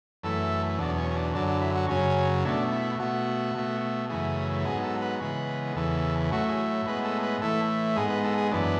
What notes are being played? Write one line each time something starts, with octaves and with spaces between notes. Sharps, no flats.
F#2 E3 A3 A4
E2 B2 F#3 D4
C#4
C#4
D4
F#2 D3 F#3 D4
D4
E4
F#4
F#2 C#3 F#3 C#4
B2 A3 D4
E4
B2 A3 F#4
B2 A3
F#2 C#3 E3 A3 G#4
G#2 F#3 B3 G#4
A4
B4
C#3 E3 G#3 B3 B4
E2 C#3 E3 A4
A2 F#3 A3 F#4
G#4
A2 G#3 B3 B4
A4
B4
A2 E3 A3 A4
G#2 G#3 B3 G#4
B4
A4
G#4
F#2 E3 B3 D4